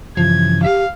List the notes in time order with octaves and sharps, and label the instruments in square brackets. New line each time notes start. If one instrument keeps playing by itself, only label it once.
[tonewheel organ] G2 C#3 E3 [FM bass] F3 [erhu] G#6
[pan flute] G4 [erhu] F5